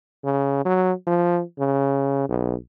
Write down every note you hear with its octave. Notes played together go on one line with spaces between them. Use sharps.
C#3
F#3
F3
C#3
B1